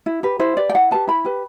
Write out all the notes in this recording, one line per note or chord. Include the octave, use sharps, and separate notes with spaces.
E4
G4 B4
E4 C5
G4 B4 D5
G5
E4 F#5
G4 B4 A5
E4 B5
G4 B4